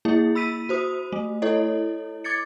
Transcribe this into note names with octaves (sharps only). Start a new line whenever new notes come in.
A#3 E4 G#4
B5 E6 B6 D#7
F#4 C5 D#6
A3
E4 A4 C#5 D#5
D6 G#6 A6 C#7